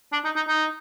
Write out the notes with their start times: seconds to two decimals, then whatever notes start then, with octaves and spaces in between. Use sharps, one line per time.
0.13 D4
0.24 D#4
0.36 D#4
0.48 D#4